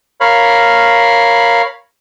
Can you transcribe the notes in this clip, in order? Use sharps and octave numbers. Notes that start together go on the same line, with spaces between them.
A#4 C#5 F5 B5